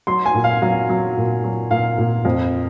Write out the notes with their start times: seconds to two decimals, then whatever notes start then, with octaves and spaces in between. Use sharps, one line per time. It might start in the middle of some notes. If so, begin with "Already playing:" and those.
0.07 F#3 C6
0.25 G#5
0.34 A#2
0.44 F5
0.62 F#3 F5
0.89 F#3
1.17 A#2
1.44 F#3
1.71 A#2 F5
1.98 A#2
2.25 F2